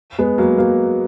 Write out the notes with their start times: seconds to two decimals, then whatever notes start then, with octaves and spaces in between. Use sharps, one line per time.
0.19 G#3 B3
0.38 F#3 A#3
0.58 F#3 A#3